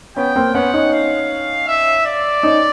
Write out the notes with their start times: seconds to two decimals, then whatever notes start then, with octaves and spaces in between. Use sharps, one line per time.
0.16 B3 C#4 G5
0.35 A#3 C4
0.54 B3 C#4 F#5
0.74 C#4 D#4
0.92 F5
1.68 E5
2.06 D5
2.43 C#4 D#4